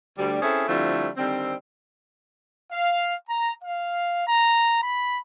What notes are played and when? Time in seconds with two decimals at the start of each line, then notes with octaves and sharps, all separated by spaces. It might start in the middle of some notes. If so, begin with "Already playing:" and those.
0.18 D2 G3 D5
0.42 C4 C#4 E4 G#4 A4 C5
0.69 D3 F3 G3 A3 C4 E4
1.17 D3 D#3 G3 C4
2.72 F5
3.28 A#5
3.64 F5
4.27 A#5
4.83 B5